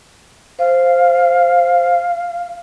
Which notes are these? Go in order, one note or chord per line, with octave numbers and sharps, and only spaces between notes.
C5 F5